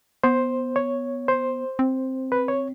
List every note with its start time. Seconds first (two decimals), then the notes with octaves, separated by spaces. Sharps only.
0.24 B3 C5
0.76 C#5
1.28 C5
1.79 C4
2.32 B4
2.48 C#5